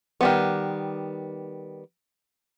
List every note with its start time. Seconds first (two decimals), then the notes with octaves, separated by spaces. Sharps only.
0.21 D#3 G3 B3